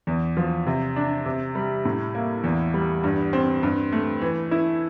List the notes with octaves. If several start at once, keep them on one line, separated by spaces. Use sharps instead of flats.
E2
F3
C3
D4
C3
G3
A2
A#3
E2
G3
G2
C4
G2
A3
E3
E4